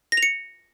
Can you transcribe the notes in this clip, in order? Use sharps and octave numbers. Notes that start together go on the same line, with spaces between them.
A#6
F7
C#7